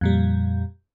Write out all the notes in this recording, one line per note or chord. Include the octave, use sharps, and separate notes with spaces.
F2 A#2 G3